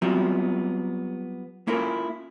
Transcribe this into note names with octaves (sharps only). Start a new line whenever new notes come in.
F#3 G3 B3 C4 F4 E5
A#3 C#4 E4 F4 A4 A#4